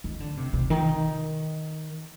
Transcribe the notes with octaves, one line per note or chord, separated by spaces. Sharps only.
D#3
D3
C3
C3
D#3